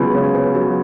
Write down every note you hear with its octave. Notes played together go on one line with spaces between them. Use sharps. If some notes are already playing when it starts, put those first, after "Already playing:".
Already playing: C#2 C#3 F#3 B3
C#3
B3
F#3